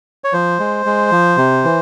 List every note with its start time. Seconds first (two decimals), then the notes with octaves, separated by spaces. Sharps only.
0.24 C#5
0.33 F3 C5
0.60 G#3
0.86 G#3
1.12 F3
1.37 C3
1.64 E3